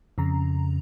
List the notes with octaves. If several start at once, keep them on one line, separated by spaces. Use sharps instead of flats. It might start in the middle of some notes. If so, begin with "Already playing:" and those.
F2 C#3 A#5